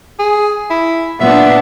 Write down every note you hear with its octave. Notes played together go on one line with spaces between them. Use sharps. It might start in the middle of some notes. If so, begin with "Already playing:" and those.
G#4
E4
A#2 B3 D4 E5